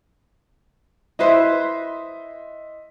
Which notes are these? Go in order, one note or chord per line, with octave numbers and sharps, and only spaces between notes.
E4 B4 C5 D#5 E5 C6